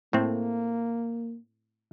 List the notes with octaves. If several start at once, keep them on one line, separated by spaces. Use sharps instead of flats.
A2 A3 A#3 C4